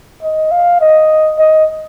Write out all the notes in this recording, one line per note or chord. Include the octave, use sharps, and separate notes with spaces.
D#5
F5
D#5
D#5